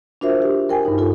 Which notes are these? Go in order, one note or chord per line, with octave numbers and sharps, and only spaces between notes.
D4 F4 F#4 A#4 C5 E5
G4
A#4 G5 G#5
G2 D#4
F4 A4